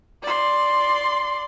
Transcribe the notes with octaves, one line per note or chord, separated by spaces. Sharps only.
D5 C6